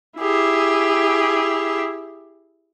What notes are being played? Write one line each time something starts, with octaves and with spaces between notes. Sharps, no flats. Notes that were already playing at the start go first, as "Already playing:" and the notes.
E4 G4 G#4